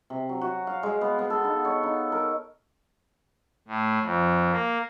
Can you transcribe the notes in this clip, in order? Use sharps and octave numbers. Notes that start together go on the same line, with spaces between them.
C3
F#3
F#4
F5
G#3
B3
B3
A4
D#4
C#5
D#4
A#4
A2
F2
A#3